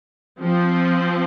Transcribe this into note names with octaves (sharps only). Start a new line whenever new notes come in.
F3 C4